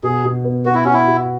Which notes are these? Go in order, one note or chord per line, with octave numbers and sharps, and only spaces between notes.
B2 G#4
B2
B3
B3 F#4
E4
C#4 F#4
E4
B2